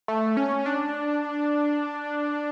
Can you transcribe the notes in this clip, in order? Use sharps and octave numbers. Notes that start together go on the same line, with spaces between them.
A3
C#4
D4